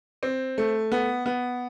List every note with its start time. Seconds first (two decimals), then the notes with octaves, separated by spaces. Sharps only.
0.23 C4
0.58 A3
0.92 B3
1.26 B3